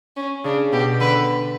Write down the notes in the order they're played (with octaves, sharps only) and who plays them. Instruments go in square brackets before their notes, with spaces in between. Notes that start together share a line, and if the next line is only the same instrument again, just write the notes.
[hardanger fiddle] C#4
[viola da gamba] C#3 [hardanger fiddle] D4
[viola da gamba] B2 [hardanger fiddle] G4
[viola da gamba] D3 [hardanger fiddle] B4